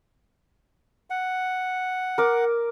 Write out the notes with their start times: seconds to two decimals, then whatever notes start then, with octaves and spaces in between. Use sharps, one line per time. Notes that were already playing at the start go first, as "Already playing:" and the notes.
1.10 F#5
2.18 A#4 D6